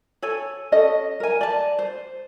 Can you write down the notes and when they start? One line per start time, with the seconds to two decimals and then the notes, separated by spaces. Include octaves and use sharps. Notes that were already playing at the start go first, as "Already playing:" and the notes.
0.22 A4 C#5 G#5
0.72 C#4 A4 D#5
1.20 A#4 G#5
1.41 D5 A5
1.79 C5